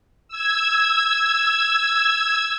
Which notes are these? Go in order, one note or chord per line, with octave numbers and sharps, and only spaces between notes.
E6 G#6